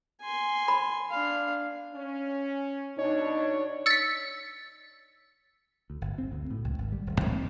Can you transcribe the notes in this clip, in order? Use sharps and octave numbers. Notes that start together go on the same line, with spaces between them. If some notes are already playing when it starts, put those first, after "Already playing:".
G#5 C6
B5
D4 F5
C#4
B2 D4 D#4 C#5
E6 A6 B6 C#7
D2
G1
C4
D2
A2
C#2
G#1
G3
D#1
C#2
C4